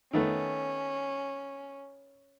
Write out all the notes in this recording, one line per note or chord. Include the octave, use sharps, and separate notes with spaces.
D#3 A3 B3 C#4